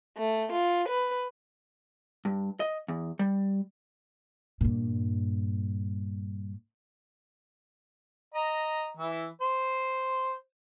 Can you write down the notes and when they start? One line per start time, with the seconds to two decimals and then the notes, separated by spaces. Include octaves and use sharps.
0.17 A3
0.51 F4
0.89 B4
2.25 G2
2.60 D#5
2.88 E2
3.19 G3
4.61 G2 A#2
8.34 D#5 A#5
8.97 E3 E4
9.41 C5